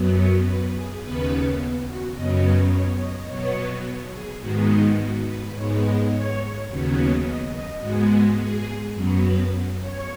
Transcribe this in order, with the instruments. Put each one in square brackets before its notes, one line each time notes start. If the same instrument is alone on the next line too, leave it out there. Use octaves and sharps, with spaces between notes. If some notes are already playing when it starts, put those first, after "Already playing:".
Already playing: [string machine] F#2 F#3 B3
B4
G#4
D#2 C#3 B3 B4
F#4
F#2 C#3 F#3 B3 D#5
C#5
C#5
D#5
B2 F#3 B3 C#5
G#4
G#2 D#3 G#3 B3 F#4
D#4
F#4
B4
G#2 G#3 B3 C#5
D#5
C#5
D#2 C#3 F#3 B3
C#5
D#5
D#5
G#2 G#3 B3 F#4
F#4
G#4
F#2 F#3 B3
B4
C#5